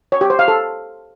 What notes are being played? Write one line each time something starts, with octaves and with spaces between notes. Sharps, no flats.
C#5
G4
C5
F5
A4